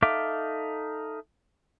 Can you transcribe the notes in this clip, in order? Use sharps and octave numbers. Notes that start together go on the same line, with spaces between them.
D#4 A4 E5 F5 D6